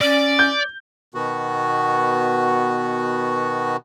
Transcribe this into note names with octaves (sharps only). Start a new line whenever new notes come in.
C#4 D5
G6
B2 D#3 B3 F#4